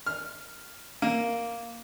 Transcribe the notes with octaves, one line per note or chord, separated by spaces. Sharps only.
F6
A#3